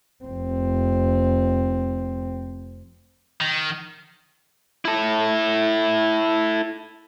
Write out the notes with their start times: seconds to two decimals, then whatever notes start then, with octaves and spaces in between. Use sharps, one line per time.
0.25 F1 C4
3.41 D#3
4.85 E4 A4